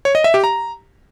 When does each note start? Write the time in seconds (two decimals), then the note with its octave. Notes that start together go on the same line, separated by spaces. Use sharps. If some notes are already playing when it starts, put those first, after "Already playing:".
0.05 C#5
0.15 D#5
0.24 E5
0.34 G4
0.44 A#5